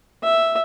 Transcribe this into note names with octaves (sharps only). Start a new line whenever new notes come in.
E5